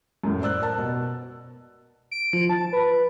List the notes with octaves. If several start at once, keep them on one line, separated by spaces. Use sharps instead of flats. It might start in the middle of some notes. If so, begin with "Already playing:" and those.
F#2 A2
C5 D5 E6 F#6
A#4 A5
B2
D7
F3
A5
B4